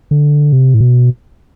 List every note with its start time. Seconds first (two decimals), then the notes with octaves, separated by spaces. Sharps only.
0.11 D3
0.53 C3
0.74 A2
0.80 B2